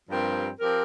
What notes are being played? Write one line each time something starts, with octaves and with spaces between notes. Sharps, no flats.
G2 F3 C4 G4 A#4
F3 C4 G4 A#4